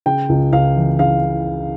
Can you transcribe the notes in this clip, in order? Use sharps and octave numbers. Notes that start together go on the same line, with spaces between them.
C#3 G5
C#2
C#2 F5
E3
C#3 F5